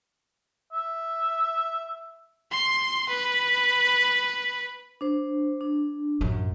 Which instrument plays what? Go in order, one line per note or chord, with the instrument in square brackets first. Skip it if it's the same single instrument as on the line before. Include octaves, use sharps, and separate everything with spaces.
[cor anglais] E5
[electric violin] C6
B4
[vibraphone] D4 C5
D4
[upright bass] A1 F#2